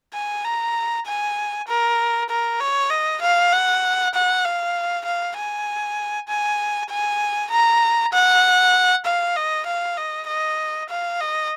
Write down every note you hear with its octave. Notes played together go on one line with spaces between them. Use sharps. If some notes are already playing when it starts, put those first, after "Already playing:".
G#5
A#5
G#5
A#4
A#4
C#5
D#5
F5
F#5
F#5
F5
F5
G#5
G#5
G#5
A#5
F#5
F5
D#5
F5
D#5
D#5
F5
D#5